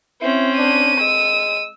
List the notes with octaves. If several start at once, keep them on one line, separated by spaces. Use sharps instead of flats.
C4 C#4 E4
D4 D#7
G#3 E6